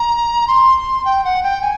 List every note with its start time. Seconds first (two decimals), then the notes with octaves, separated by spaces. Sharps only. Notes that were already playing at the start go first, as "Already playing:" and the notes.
Already playing: A#5
0.47 C6
1.05 G5
1.24 F#5
1.43 G5
1.61 G#5